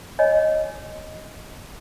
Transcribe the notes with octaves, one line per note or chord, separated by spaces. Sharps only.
C#5 D#5 G#5